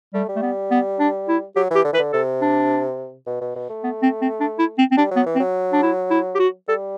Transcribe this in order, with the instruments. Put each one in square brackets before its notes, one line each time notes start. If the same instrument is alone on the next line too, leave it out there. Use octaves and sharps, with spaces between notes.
[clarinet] G3 [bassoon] A3
[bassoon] G3
[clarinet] A3
B3
B3
D4
E4
[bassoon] F#3 [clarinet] G4
[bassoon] E3 [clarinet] G4
[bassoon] D3
[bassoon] E3 [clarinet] B4
[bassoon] D3
[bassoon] C3 [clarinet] A4
[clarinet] D4
[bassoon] B2
B2
B2
A3
[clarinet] B3
C4
C4
D4
E4
C4
C4
[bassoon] G3 [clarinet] D4
[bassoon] F#3 [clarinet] B3
[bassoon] E3
[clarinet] C4
[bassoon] F#3
[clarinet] D4
E4
E4
G4
F#4
[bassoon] G3 [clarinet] A4